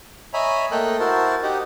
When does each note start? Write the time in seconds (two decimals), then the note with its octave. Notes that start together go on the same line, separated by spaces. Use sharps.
0.33 C#5 D#5 E5 G#5 A#5 B5
0.72 A3 A#3 A4 D#5 G5 F#6
1.00 E4 F#4 A#4 C5 A5
1.43 D#4 G4 D#5 F#5